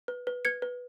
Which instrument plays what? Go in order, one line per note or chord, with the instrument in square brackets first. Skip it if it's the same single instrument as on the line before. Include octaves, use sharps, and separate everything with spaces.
[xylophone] B4
B4
B4 G#6 C#7
B4